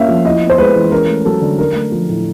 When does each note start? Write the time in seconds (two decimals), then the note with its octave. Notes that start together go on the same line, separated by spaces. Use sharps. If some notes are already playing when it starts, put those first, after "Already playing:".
Already playing: A#3 C#4 E4 E5 F5
0.09 F3
0.25 E4 D#5
0.41 B3
0.50 C5
0.58 G#3 B4
0.76 E3
0.92 C#4 A#4
1.09 A3
1.25 F#3 A4
1.42 D3
1.58 D4 A#4
1.75 A3
1.92 F3
2.09 A2